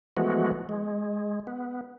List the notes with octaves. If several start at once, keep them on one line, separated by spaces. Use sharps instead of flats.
E3 F3 G#3 A3 B3 F#4
G#3
B3